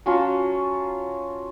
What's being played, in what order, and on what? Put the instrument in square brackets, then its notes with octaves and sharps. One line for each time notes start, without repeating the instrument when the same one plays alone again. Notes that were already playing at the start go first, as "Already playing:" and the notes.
[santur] F#3 C#4 F4 A5